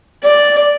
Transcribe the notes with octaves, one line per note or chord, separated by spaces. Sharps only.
D5